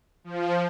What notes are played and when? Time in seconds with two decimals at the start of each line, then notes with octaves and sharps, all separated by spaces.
0.24 F3